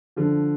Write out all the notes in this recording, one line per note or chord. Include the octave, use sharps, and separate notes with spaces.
D3 F3